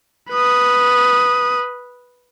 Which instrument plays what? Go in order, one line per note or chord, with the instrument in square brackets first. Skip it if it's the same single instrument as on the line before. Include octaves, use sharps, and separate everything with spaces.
[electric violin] B4 D#6